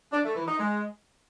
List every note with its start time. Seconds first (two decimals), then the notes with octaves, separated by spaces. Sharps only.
0.13 D4
0.24 A3
0.36 E3
0.48 D#4
0.59 G#3